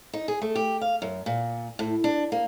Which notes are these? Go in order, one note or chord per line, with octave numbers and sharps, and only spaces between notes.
D#4
G#4
A3
G4
F5
F#2
A#2
A2
D4
A#3